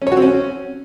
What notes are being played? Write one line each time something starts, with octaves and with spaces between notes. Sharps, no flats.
C#4
C#5
F#4
C4
C#4